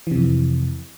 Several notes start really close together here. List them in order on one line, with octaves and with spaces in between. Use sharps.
E3 C3 F2